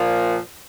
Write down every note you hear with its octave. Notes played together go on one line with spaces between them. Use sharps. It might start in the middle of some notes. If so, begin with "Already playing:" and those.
Already playing: A#2 F3